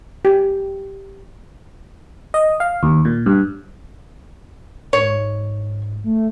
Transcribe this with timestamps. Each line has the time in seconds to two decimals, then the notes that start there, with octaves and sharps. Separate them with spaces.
0.25 G4
2.34 D#5
2.60 F5
2.83 D#2
3.05 A#2
3.26 G2
4.93 G#2 C#5
6.04 A3